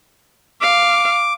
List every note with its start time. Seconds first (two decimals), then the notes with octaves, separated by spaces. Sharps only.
0.61 F5 D6